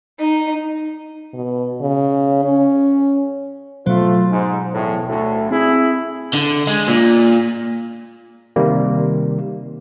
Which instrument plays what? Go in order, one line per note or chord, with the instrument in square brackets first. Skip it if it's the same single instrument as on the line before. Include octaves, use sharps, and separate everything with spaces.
[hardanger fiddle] D#4
[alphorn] B2
C#3
C#4
[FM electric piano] B2 F#3 C5 [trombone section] A3 F4
[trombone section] G#2
B1 E2 A2
D2 A2
[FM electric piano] C4 [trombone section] E4 G#4
[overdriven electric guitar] D3
G#3
A#2
[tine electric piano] C3 D#3 G3 A#3